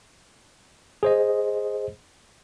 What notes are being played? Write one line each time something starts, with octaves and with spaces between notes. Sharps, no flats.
G#4 C5 D#5